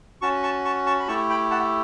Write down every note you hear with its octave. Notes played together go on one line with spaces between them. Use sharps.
C#4 F#4 A5 C#6
A5 C#6
A5 C#6
A5 C#6
B5
A3 E4 G4 A5 C#6
G5 B5
F#5 A5